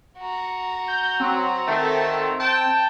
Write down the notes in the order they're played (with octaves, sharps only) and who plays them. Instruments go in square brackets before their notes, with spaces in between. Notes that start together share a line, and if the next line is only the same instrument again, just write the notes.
[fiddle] F#4 A#5
[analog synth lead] G6
[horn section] F#3 [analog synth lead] C4
[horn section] D#3 A3 A4
G5 A5